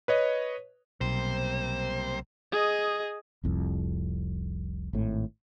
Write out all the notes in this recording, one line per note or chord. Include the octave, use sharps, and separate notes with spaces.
B4 C#5 D#5
B1 C3 G3 A#3 C5
G#4 D#5
F1 C2 F2
G#1 A2